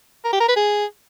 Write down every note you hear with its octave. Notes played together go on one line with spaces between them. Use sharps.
A#4
G4
A#4
B4
G#4